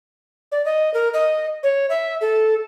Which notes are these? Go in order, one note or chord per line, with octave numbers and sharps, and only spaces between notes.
D5
D#5
A#4
D#5
C#5
E5
A4